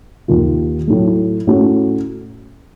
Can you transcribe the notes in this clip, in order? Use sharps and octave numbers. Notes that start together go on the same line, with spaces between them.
D#2 D#3 A#3 F4
A2 F#3 A3
A2 A3 C#4 F#4